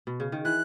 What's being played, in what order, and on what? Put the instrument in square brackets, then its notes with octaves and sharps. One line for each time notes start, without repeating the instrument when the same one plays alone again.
[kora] B2
C#3
D#3
[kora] E3 [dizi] F#6